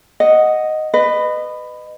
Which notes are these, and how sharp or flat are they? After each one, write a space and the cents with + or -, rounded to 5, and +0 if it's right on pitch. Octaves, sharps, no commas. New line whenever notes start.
D#5 +0 F#5 +0
B4 +15 D#5 -25